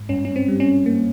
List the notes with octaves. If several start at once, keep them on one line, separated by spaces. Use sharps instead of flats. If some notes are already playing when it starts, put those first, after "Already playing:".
Already playing: G#2
G2 C#4
C#4
C4
G3
C#4
A#3